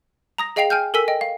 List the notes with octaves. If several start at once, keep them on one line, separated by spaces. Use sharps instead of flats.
A#5 D#6 A#6
G#4 D#5 F5 G5 C7 F7
G5 G#5 F6 G6
A4 A#4 G#5 E6 B6
D#5 G5
F5